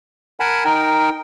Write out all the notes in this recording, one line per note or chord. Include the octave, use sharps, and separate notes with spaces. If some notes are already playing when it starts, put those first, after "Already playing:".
A#4 F#5 G#5 A5 B5
D#4 A#4 G5